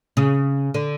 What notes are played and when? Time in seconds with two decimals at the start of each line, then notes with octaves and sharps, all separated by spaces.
0.17 C#3
0.74 D3